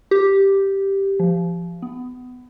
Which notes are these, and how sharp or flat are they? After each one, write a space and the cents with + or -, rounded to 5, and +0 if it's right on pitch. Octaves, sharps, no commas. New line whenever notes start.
G4 +0
F3 -25
B3 +20